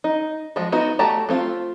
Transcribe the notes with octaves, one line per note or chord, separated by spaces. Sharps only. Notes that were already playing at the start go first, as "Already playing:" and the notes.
D#4
F3 G#3 F#4
B3 D#4 F#4
A3 F#4 G4 A5 A#5
A3 C4 F4